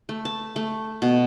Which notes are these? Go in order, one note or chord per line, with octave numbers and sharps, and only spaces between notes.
A3
A5
A3
B2